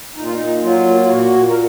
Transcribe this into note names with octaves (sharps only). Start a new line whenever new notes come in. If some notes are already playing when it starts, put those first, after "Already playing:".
A#2 D#4
F4
D#4
A#2
F#3 F4
A#3
F4
A#2 F#4
A#2
A#4